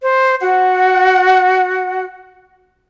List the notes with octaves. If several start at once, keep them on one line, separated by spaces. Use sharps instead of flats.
C5
F#4 F#5